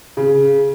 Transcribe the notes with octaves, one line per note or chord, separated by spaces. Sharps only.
C#3